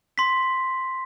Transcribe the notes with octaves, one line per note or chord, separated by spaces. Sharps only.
C6 B6